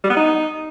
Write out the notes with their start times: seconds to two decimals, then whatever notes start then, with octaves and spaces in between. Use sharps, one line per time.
0.04 G3
0.10 B3
0.16 D#4